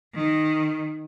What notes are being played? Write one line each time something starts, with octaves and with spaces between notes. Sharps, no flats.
D#3